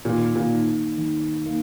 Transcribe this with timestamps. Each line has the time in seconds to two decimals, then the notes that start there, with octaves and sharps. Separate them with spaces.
0.05 A#2 D#3
0.36 A#2
0.51 A#3 D#4
0.98 D#3
1.46 A#3 D#4